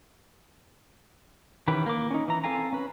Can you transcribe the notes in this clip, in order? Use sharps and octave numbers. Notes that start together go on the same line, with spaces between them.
D#3 E3 C#4 G4 B4
A#3 D6
C#4 D#4
E3 A#5
C4 A4 F5 G#5 A#5
C#4 B4